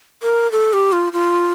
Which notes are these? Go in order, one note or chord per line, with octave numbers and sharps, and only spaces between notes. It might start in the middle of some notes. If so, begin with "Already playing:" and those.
A#4
A4
G4
F4
F4